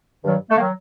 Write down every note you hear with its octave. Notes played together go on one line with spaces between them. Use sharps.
G2 D#3 F#3
A3
D#3 F#3 A#3